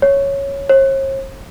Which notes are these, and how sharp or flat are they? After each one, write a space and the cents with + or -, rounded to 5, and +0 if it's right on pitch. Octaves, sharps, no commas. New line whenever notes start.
C#5 +0
C#5 -45